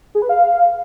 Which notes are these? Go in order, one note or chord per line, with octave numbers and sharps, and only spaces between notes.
G#4
B4
F5